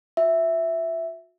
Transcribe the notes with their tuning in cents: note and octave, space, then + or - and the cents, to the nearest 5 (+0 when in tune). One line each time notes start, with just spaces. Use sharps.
F#4 -45 E5 +0